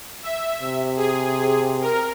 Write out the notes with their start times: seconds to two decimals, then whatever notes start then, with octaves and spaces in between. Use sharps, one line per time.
0.23 E5
0.60 C3
0.97 G#4
1.81 A#4